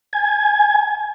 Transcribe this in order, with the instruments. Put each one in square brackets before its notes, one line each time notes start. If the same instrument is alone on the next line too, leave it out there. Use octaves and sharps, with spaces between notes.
[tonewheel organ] G#5